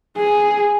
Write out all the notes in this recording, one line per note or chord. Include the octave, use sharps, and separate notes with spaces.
G#4